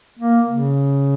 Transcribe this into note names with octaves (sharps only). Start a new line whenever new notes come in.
A#3
C#3